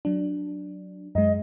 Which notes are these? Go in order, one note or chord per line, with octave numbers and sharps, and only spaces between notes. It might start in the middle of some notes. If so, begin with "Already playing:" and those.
F#3 D4
F#2 G#3 D#5